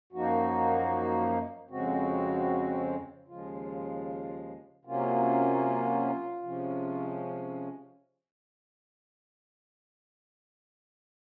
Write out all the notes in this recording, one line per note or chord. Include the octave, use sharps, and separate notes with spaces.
F#2 F3 A#3 D#4 F#4
F2 C#3 G#3 C4 F#4
D#2 C#3 F3 G#3 F4
C3 F#3 A#3 C#4 F4
C3 F3 G#3 C#4